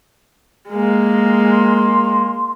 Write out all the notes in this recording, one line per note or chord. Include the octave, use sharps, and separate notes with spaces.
G#3 A#3
C6